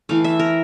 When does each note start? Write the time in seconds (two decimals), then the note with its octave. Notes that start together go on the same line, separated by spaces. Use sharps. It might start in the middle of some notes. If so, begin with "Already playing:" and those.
0.09 E3 A3 F5
0.24 E5
0.39 A#4